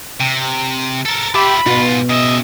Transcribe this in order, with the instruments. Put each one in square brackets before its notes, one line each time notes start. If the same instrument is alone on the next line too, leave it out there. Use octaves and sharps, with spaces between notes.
[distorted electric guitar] C3
[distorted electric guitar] A4 A#4 [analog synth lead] A6
[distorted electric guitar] F4 E5 [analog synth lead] G4 [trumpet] B5
[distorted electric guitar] G#2 F4 [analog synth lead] B2
[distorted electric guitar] C#3 E5 [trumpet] D#5